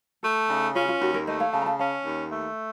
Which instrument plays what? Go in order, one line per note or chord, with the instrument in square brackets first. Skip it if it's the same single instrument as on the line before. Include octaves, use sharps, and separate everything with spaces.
[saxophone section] A3 [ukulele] A4
[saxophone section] C#3 [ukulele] D#4
[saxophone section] C#4 [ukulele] F4
[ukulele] F4
[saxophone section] D#2 [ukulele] F#4
[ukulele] A#4 C#5
[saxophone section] A3 [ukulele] C5 D#5
[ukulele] C#5 F5
[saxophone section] C#3 [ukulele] F5 A5
[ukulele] A#5
F5 A5
[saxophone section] C#4 [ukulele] F5 A5
[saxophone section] D#2
A3